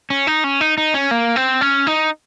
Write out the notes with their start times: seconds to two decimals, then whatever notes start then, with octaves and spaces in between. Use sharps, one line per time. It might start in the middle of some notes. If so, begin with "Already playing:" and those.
0.10 C#4
0.27 D#4
0.44 C#4
0.61 D#4
0.78 D#4
0.94 C#4
1.11 A#3
1.36 C4
1.61 C#4
1.87 D#4